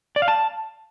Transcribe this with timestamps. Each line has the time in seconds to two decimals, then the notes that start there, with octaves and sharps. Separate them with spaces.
0.16 D5
0.22 F5
0.28 A5